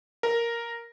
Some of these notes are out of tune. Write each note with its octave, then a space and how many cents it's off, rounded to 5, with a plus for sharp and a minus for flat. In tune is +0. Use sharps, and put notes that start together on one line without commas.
A#4 +0